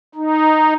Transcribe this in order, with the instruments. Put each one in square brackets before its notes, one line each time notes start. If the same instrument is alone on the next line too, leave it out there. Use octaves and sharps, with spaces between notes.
[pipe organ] D#4